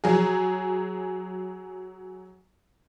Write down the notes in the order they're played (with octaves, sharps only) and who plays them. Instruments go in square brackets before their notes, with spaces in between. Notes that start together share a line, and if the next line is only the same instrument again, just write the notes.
[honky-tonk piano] F#3 G#4